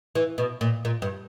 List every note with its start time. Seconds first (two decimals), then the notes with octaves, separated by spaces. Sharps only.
0.15 E3
0.38 B2
0.61 A#2
0.85 A#2
1.02 G2